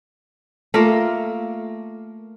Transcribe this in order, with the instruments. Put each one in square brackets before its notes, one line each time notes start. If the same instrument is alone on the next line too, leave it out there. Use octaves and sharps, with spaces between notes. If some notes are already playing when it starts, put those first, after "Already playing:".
[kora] A3 A#3 F4 A#4